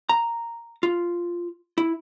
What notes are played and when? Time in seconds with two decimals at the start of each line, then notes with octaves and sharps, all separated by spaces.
0.09 A#5
0.83 F4
1.78 E4